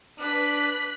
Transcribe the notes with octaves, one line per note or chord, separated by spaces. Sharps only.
D4 B4 F#6 B6